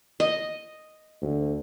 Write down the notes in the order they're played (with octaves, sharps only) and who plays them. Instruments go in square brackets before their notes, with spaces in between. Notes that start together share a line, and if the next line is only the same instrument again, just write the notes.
[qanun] D#5
[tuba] D2